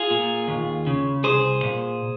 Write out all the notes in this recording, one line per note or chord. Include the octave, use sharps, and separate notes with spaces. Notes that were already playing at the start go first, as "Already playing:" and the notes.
Already playing: F4 G#4
A#2
D#2
C#3
C2 G#4 C5
A#2